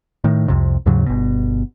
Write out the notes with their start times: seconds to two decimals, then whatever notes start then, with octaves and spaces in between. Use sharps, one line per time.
0.24 A2 D#3
0.48 C2 F2 C3
0.86 D#2 G#2 C#3 F#3
1.06 G1 B2